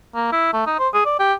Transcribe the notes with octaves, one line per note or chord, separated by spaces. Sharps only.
A#3
E4
A3
D#4
C5
G#4
D5
G4